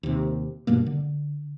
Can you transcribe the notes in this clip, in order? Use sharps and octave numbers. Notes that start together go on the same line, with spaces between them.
D#2 C3
G2 B2 G3 A#3
D3